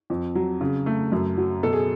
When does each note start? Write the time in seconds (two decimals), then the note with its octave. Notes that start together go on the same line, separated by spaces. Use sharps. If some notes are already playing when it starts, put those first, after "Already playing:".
0.10 F2
0.35 F#3
0.61 C#3
0.86 A3
1.12 F#2
1.37 F#3
1.63 B2 A4
1.73 G#4